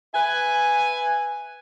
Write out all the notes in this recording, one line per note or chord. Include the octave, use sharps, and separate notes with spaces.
B4 E5 G#5